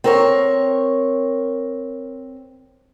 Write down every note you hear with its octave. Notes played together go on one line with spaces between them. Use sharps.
C4 A#4 C#5